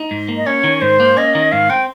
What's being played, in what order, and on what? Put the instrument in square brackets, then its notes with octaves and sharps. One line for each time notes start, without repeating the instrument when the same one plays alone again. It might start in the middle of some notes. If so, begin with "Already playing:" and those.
Already playing: [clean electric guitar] D#4
G#2
A#3
[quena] D#5
[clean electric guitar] C#4 [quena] C#5
[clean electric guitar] D#3
[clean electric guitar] G#2 [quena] C5
[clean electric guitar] A#3
[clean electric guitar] C#4 [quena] D#5
[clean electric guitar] D#3
[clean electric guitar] G#2 [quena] F5
[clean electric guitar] C4 [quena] G5